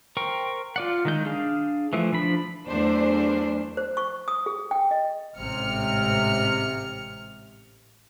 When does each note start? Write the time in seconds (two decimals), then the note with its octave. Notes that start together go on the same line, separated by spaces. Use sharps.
0.17 A#4 C5 G5 C#6
0.76 F4 D5 F#5
1.05 D#3 G#3 G6
1.26 D4 G#4 F5
1.93 E3 F3 A3
2.13 F3 D4 B5
2.67 E2 F#3 A3 D4 C5
3.77 C5
3.97 C#6
4.28 D#6
4.46 G#4
4.71 G5
4.91 D#5
5.38 A1 G#2 C3 F6 C#7